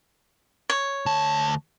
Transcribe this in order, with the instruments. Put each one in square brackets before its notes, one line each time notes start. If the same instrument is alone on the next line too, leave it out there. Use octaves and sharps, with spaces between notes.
[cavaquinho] C#5
[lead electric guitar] D2 A5